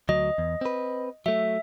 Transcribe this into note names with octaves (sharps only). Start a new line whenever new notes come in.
D2 F#3 D#5
E2
C4 B4
F#3 A3 E5